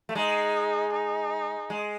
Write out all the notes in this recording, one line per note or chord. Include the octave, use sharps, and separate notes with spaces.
A3
G#3 D#4
D#4
G#3